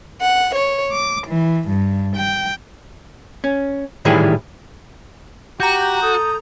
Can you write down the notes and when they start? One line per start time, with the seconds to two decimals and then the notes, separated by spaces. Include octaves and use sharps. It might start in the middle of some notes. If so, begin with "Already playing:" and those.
0.21 F#5
0.55 C#5
0.94 D6
1.29 E3
1.70 G2
2.17 G5
3.44 C#4
4.05 A2 D#3 E3 G3 E4 G#4
5.60 F#4 G4 A#5 G6
6.02 A4 D#6